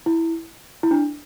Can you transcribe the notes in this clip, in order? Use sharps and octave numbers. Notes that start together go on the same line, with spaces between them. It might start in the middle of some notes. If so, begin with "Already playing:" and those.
E4
E4
D4